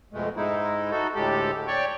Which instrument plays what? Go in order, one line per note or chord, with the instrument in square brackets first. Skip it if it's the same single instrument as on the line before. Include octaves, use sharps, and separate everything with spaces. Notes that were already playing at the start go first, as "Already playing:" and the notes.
[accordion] F2 B2 G#3 A3
G#2 G#3 D#4 E4
D#4 F#4 A4
D2 A2 G#3 G4 A4
C#5 D5 G5 C#6